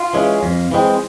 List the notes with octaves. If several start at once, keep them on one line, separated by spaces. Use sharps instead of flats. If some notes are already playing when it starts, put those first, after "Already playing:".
Already playing: F4
E3 G#3 C#4
F2
E3 G#3 C4